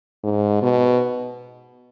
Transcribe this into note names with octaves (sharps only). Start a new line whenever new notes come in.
G#2
B2